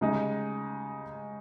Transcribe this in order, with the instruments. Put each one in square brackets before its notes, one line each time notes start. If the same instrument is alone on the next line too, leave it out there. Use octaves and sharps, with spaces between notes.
[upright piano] C#3 G#3 D#4 G4